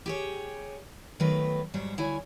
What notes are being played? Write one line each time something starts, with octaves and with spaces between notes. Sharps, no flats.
G4 G#4 C#5
D#3 F#3 A3 B3 B4
G#2 F#3 G3 C5 C#5
D2 E4 C#5 G#5